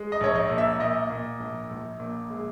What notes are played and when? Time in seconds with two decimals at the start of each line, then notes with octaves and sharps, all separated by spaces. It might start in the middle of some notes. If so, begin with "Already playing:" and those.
Already playing: G#3
0.12 D#5
0.21 A#1 C#5
0.35 D#5
0.50 A#2
0.58 E5
0.80 A#2 D#5
1.10 A#2
1.40 A#1
1.71 A#1
2.00 A#2
2.30 G#3